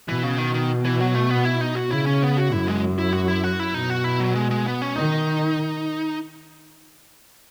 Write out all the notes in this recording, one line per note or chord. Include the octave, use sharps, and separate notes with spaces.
B2 E3
C#3
D#3
D#3
E3
F#3
A3
B3
E4
D#4
F#4
C#3 E4
C#4
B3
F#4
F#2 E4
G#3
E4
F#4
E4
F#4
E4
B2 D#4
F#4
E4
F#3
G#3
G#3
B3
C#4
D#3 D#4